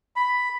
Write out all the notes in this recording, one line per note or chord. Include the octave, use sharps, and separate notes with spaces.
B5